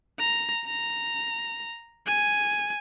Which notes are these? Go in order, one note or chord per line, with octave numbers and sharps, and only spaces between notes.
A#5
A#5
G#5